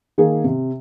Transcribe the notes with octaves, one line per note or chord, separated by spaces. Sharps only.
D#3 A#3 G#4
C3